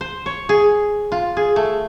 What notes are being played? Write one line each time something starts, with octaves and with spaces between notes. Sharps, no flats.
C5
C#5
G#4
F4
G#4
A3